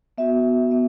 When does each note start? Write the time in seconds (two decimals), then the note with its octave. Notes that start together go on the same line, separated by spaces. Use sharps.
0.18 B3 F#4 E5
0.70 B3 E5